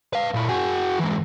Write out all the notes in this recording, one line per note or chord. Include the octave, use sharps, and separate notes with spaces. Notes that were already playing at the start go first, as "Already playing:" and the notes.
B4 F5
A#2 E4
F#4 G#4
G#2 E3